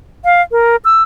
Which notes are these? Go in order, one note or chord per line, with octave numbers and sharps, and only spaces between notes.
F5
A#4
E6